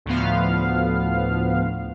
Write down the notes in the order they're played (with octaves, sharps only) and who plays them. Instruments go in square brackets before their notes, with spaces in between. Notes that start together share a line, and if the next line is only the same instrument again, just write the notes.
[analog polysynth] D2 A2 F3 B3 F5